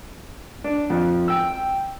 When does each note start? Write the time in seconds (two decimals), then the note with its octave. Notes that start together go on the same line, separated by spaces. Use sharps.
0.64 D4
0.90 F2
1.28 G5 E6